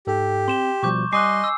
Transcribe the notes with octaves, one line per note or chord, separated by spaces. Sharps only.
G#2 G4 A4
C4 C6 E7 G7
B2 F3 G3 C#6 D6 G6
G3 D#5 G#5 C6 D6 D#6 F#6 C7
E6